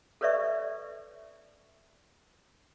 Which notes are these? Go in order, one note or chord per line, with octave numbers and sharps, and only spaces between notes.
A4 B4 C#5 D5 E5 C#6